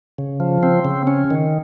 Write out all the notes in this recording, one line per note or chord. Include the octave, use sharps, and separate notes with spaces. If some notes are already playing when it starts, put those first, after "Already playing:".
C#3
F3
C4
C#3
C#4
D#3